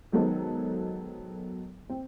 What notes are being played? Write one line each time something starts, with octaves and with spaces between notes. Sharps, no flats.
D#3 F#3 G#3 B3 A4 C5
C4